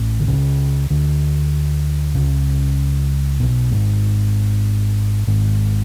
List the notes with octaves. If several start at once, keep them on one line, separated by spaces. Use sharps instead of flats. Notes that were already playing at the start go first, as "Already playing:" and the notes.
Already playing: A1 A2
D3
C#2 C#3
D2 D3
C#2 C#3
B1 B2
G#1 G#2
G#1 G#2